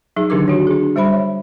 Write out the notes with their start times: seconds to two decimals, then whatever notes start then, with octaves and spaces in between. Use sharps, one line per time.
0.16 F#3 D#4 G#4
0.30 D3 D#3 D4 G4 A#4 D6
0.48 D4 F#4 C#5
0.67 D4 G#4
0.96 G3 C5 E5 B5
1.13 C#5